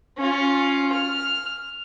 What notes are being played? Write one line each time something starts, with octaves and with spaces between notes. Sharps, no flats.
C#4 F4
F6